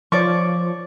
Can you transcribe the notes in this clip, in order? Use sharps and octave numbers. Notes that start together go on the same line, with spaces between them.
F3 C#5 D5 C#6